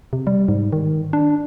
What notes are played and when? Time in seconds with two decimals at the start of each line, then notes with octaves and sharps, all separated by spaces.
0.13 C3
0.27 G3
0.48 G#2
0.73 D#3
1.13 D4